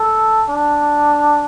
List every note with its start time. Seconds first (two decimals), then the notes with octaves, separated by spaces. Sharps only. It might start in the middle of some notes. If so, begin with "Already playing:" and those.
Already playing: A4
0.50 D4